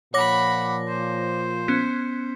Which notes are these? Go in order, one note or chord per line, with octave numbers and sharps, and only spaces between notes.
A#2 F3 C#5 F#5 B5 D6 A#6
C5
B3 C#4